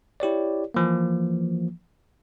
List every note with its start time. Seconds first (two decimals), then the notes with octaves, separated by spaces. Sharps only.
0.20 E4 G4 C#5 D5
0.74 E3 F3 A#3